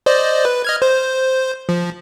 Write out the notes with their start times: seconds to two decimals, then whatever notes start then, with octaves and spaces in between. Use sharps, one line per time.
0.06 C5 D5 D#5
0.45 B4
0.65 D#5 F6 G#6
0.82 C5
1.69 F3